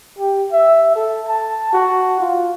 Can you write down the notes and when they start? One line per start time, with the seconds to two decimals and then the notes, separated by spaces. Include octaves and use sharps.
0.19 G4
0.52 E5
0.96 A4
1.28 A5
1.73 F#4
2.20 F4